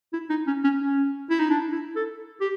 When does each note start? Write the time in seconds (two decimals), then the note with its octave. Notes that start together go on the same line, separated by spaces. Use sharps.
0.13 E4
0.30 D#4
0.47 C#4
0.64 C#4
0.81 C#4
1.30 E4
1.40 D#4
1.50 D4
1.72 E4
1.96 A4
2.41 G4